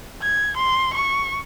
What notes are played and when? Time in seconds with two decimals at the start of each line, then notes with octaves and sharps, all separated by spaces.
0.22 G#6
0.57 C6
0.94 C#6